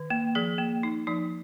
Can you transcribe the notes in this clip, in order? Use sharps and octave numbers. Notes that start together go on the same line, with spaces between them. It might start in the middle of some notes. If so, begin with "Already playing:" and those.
Already playing: D#3
A#3
F3 G#4
A#3
D#4
F3 D#4